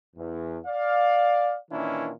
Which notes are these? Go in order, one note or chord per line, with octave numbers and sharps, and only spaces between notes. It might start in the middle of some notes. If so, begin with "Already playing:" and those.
E2
D5 F5
A#2 D#3 E3 C#4 D4 E4